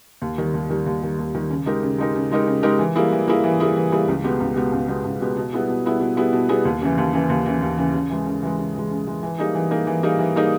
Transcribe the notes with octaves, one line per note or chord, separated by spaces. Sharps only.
D#2
D#3 G3
D#2
D#3 G3
D#2
D#3 G3
D#2
D#3 G3
C#3
G#3 D#4 G4 A#4
C#3
G#3 D#4 G4 A#4
C#3
G#3 D#4 G4 A#4
C#3
G#3 D#4 G4 A#4
E3
G3 A#3 E4 G#4
E3
G3 A#3 E4 G#4
E3
G3 A#3 E4 G#4
E3
G3 A#3 E4 G#4
C#2
B2 G#3 B3 G4
C#2
B2 G#3 B3 G4
C#2
B2 G#3 B3 G4
C#2
B2 G#3 B3 G4
B2
G3 B3 E4 G#4
B2
G3 B3 E4 G#4
B2
G3 B3 E4 G#4
B2
G3 B3 E4 G#4
D#2
C#3 E3
D#2
C#3 E3
D#2
C#3 E3
D#2
C#3 E3
C#3
E3 G#3
C#3
E3 G#3
C#3
E3 G#3
C#3
E3 G#3
E3
G3 A#3 D#4 G#4
E3
G3 A#3 D#4 G#4
E3
G3 A#3 D#4 G#4
E3
G3 A#3 D#4 G#4